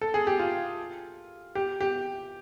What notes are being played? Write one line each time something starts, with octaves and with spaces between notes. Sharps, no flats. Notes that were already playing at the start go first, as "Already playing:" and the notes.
A4
G#4
G4
F4
G4
G4